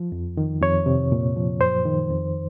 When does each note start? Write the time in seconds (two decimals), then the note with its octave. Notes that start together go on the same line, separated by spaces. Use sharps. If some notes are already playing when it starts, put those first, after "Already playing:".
Already playing: F3
0.12 F2
0.37 D#3
0.61 F2 C#5
0.86 C3
1.12 A#2
1.36 F3
1.61 F#2 C5
1.85 D#3
2.10 F2